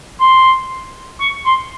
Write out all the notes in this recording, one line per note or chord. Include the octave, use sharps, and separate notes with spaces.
C6
C#6
C6